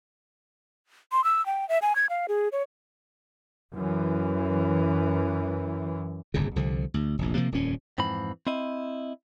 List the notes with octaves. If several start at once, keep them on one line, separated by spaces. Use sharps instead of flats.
C6
E6
G5
E5
G#5
G#6
F5
G#4
C#5
F#2 E3
D1 G1 E2 C#3
C2 D3 F3
D2
F1 A#1
C3 F3 A#3
D#1 F2 A#2 C#4
F2 G#2 E3 C4 B5
C4 E4 D#5